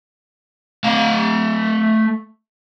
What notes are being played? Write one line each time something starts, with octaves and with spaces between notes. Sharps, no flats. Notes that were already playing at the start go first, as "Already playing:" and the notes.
A3 F5